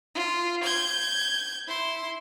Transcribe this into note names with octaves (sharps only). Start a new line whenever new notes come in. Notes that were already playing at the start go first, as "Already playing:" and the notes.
F4
G6 G#6
E4 C6